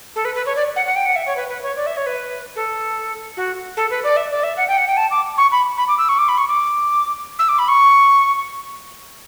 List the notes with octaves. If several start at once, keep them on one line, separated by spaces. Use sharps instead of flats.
A4
B4
B4
C#5
D5
F#5
F#5
G5
F#5
E5
C#5
B4
B4
C#5
D5
E5
C#5
B4
A4
F#4
A4
B4
D5
E5
D5
E5
F#5
G5
F#5
G5
A5
D6
C#6
B5
B5
D6
E6
C#6
D6
B5
C#6
D6
E6
D6
B5
C#6